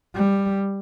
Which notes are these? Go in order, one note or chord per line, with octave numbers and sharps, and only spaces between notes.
G3